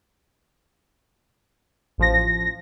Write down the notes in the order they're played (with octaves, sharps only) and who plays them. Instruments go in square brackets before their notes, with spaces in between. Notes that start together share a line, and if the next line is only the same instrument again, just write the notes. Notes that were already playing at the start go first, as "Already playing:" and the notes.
[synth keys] A1 F3 A#6